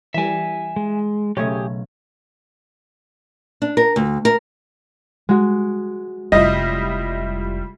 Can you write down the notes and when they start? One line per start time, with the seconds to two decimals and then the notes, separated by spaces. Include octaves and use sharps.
0.14 E3 G3 E5 G#5
0.76 G#3
1.37 B1 C#3 A3 G4 C#5 G#5 D#6
3.62 D4
3.77 A#4
3.96 D2
4.25 A#4
5.29 G#3 F#4
6.32 F1 G3 E4 F4 D#5